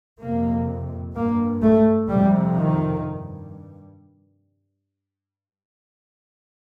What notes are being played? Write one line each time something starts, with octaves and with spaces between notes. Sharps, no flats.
F2 C3 A#3
G2 A#3
A3
F2 C3 G3
D#3
G2